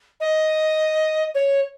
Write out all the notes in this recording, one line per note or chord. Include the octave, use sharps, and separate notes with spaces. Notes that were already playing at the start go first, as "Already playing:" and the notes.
D#5
C#5